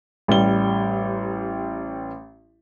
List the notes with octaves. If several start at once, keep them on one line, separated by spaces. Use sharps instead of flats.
A1 G3 G7